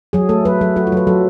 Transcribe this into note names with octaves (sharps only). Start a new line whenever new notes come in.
F#3 G#4
A3 A4
F#3 B4
F#3 A4
F#3 F#4
F4
F#3 B4
F#3 A4